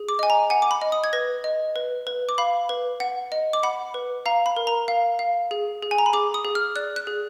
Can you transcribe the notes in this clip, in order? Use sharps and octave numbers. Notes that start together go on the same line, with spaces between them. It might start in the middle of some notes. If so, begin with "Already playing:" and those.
Already playing: G#4
D6
D#5 G#5
A#5
F#5 G#5
D6
B5
D#5
D#6
G#6
B4 A#6
D#5
B4
B4
D6
F5 B5
B4
F#5
D#5
D6
F#5 B5
B4
F5 A#5
B5
A#4
A#5
F5
F5
G#4
G#4
G#5
A#5
B5
G#4 D6
D#6
G#4
F6
D5 F#6
F#6
G#4